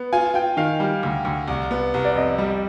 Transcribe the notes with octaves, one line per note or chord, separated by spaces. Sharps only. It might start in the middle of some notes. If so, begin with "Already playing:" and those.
Already playing: B3
F4 G#5
F4 G5
D#3 F5
G3
D2
D2
C2
B3
C2
D5
F2 D#5
G3